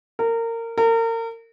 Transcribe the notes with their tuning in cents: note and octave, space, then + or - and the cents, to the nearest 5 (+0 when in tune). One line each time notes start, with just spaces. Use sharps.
A#4 -25
A#4 -35